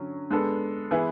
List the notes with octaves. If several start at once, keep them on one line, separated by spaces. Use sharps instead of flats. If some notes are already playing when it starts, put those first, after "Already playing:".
Already playing: D3 F#3 C#4
G#3 B3 D4 A4
E3 B3 E4 G#4